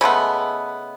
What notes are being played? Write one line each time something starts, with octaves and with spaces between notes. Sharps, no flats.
C#3 G#3 A3 B3